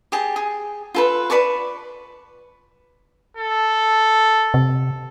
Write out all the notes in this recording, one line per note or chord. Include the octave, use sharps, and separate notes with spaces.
G4 G#4 A5
G#4
F4 A4 B4
B4 D5 A5 C#6
A4
C3